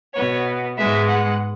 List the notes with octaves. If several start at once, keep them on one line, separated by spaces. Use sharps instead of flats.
B2 B3 C#5
G#2 G#3 B3 E5
F#5